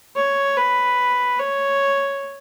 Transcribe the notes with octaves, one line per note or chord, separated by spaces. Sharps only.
C#5
B4
C#5